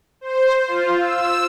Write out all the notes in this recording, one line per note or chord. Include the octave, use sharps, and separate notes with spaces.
C5
F4
E6